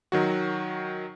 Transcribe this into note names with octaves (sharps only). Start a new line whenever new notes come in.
D#3 F#3 F#4